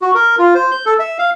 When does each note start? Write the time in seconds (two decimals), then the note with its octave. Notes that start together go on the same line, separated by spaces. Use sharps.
0.02 F#4
0.14 A#4
0.39 F4
0.55 C5
0.72 G6
0.86 A4
0.99 E5
1.18 F5